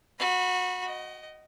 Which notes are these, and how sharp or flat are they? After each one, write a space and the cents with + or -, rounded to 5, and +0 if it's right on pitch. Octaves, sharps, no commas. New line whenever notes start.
F#4 -25 B5 +0
D#5 +0 F#5 +40